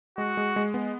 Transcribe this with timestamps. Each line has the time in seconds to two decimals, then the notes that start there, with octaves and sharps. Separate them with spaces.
0.18 G#3 F#4
0.37 G#3
0.56 G#3
0.74 B3